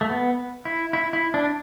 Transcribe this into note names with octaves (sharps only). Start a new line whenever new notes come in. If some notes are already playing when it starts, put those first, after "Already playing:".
A3
B3
E4
E4
E4
D4